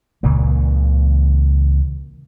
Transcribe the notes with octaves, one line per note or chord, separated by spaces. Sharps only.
C#2 A#2 C#3 E3